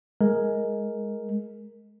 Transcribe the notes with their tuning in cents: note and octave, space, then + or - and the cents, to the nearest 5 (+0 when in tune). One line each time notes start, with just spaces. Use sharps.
G#3 +15 A#4 +0